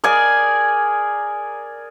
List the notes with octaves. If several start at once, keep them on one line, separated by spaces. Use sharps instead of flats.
G#4 A#4 D5 G#5